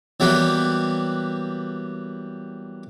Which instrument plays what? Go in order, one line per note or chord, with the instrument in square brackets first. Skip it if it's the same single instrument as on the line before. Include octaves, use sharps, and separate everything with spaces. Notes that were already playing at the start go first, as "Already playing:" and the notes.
[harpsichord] E3 F#3 G3 A#3 B3